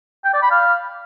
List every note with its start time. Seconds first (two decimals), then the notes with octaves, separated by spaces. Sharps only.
0.25 G5
0.34 D5
0.42 B5
0.51 F5